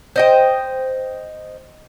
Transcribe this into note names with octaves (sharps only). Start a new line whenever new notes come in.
C5 D#5 G5